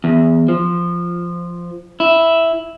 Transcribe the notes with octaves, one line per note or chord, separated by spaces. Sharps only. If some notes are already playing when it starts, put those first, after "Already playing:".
E2
F3
E4